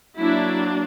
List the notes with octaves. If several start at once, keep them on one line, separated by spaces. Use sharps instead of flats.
F#3 A#3 D4 E4